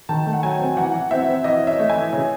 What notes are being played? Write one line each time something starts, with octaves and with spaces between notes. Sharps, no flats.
D#3 A5
A3
F#5
F#3 G#5
C4
E3 F#5
E3
C4 E5
C4
E3 D#5
C#4
E5
A3
G#5
E3
C#3